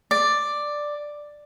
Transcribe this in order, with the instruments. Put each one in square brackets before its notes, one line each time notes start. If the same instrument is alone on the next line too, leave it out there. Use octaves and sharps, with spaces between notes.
[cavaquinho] D5